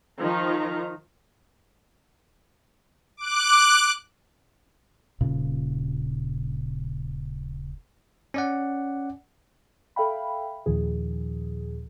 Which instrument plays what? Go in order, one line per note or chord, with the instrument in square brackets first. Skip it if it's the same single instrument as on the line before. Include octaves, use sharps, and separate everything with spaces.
[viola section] D#3 F3 D#4 A#5
[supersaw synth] D6 F#6
[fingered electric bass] D#1 A#2 C#3
[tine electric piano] C#4 D5 F#5
[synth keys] A4 E5 F5 G5 B5
D#2 A#2 D#3 F3 G#4